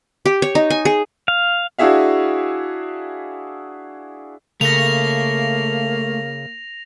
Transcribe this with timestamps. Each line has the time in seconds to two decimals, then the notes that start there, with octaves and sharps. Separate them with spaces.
0.26 G4
0.42 C#5
0.55 D#4
0.70 G#5
0.85 G#4
1.28 F5
1.78 D4 E4 F#4 G#4 E5 F5
4.61 C#3 A3 A#3 A#6 F7